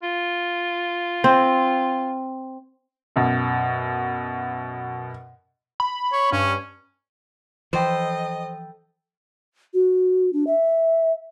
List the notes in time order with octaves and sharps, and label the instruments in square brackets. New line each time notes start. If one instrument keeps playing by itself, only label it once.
[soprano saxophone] F4
[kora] C4
[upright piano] F#2 B2
[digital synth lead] B5
[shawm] C#5
[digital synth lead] G2 [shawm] C#4
[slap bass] E3 F3 [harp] A4 G5 B5 [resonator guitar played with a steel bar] C5 [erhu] D#5
[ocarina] F#4
D4
E5